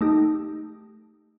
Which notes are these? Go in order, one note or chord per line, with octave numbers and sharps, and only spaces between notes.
A3 D#4 G4